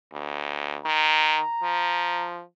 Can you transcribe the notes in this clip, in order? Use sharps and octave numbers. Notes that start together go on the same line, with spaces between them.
D2
D#3 A#5
F3